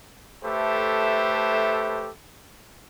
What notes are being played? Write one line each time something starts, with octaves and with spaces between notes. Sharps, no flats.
A3 G4 A4 B4 C5 E5